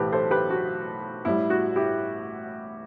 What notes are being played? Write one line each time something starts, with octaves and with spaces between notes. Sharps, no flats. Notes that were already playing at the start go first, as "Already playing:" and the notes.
Already playing: B1 A2 E3 A3 G4 B4 C5
A4 C5
G4 B4
F#4
A1 A2 G3 E4
F#4
E4 G4